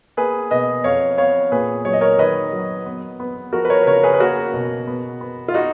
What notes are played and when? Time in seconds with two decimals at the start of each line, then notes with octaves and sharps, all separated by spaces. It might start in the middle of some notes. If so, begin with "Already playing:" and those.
0.17 A#3 G#4 B4
0.51 B2 B4 D#5
0.84 F2 C#5 F5
1.18 B3 C#5 F5
1.52 A#2 G#4 B4
1.85 F#3 C#5
1.93 D#5
2.01 A#4 C#5
2.19 D#3 B4 D#5
2.53 F#3
2.86 B3
3.20 B3
3.53 F3 F#4 A#4
3.65 B4
3.70 A#4 C#5
3.83 B4
3.87 C#3 A#4 C#5
4.03 G#4 B4
4.14 B4
4.20 A#3 F#4 A#4
4.53 B2
4.87 B3
5.21 B3
5.48 F4
5.54 D#4 F#4